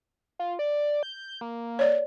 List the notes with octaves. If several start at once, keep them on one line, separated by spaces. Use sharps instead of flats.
F4
D5
G6
A#3
C#5 D5